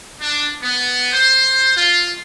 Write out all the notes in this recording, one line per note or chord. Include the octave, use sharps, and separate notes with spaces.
D4
B3
C5
F4